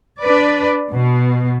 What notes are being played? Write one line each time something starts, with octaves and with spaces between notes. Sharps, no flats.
D4 B4 D5
B2